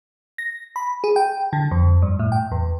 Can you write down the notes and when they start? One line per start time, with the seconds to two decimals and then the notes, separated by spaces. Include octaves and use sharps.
0.38 A#6
0.76 B5
1.04 G#4
1.16 G5
1.53 D3
1.71 F2
2.02 G2
2.19 A2
2.32 G5
2.52 E2